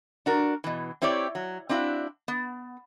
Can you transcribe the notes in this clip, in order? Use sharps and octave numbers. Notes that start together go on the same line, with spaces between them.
D4 F#4 A#4
B2 E3
C4 E4 G4 C#5 D5
F#3
C4 D4 E4 F#4 F5
B3